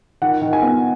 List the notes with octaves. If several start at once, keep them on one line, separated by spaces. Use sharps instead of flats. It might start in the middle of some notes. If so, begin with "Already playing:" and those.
D#3 F#5
D#3
G#5
B3